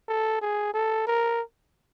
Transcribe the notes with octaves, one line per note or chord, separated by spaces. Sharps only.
A4
G#4
A4
A#4